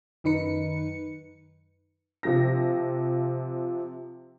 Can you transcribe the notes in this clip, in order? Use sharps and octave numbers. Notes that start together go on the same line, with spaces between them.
F#2 D#3 D#4 B4 C#7
C3 F3 A#6